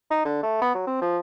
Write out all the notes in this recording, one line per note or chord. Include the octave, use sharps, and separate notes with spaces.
D#4
D3
A3
B3
F#3
C4
F3